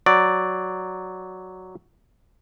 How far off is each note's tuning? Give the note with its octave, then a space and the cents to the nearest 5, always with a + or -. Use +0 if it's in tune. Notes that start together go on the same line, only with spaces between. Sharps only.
F#3 +0 D5 +0